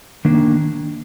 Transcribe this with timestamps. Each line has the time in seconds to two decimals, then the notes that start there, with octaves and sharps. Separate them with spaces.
0.25 D#3 A#3 D4